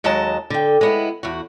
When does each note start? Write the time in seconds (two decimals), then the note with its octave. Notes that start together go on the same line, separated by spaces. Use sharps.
0.04 D#2 F#3 G#3 D#5 A5
0.50 D3 G5
0.81 G#3 B3 E4
1.23 E2 F#4